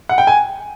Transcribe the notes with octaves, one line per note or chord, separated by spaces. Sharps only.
F#5
G5
G#5